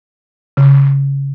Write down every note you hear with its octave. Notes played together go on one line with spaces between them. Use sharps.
C#3